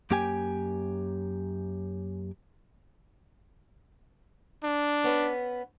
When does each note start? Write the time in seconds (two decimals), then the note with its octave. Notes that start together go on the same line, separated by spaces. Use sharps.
0.11 F#2 A#3 G4 G5 G#5
4.64 D4
5.04 B3 C#4 B4